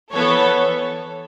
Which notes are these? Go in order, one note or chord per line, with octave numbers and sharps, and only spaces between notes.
E3 B3 A4 C#5